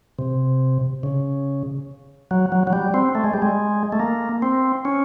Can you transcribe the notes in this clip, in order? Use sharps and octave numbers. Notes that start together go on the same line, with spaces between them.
C3
C#3
F#3
F#3
F#3
G3
C4
A3
G#3
G3
G#3
A3
A#3
C4
C#4